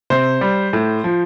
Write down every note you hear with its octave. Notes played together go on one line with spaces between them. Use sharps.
C3 C5
G3
A2
F3